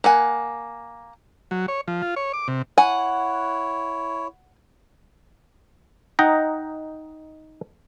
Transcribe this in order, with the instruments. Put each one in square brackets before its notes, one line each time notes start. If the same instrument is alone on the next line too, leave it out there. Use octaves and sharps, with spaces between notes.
[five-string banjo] A#3 F#5 G#5
[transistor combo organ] F#3
C#5
F3
F4
C#5
D6
C3
[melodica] E4 C#5 [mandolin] F#5 [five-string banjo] G#5
[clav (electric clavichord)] D#4 D#5 F#5 G5 A#5